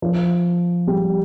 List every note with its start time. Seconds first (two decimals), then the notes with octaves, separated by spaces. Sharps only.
0.02 F3
0.87 G3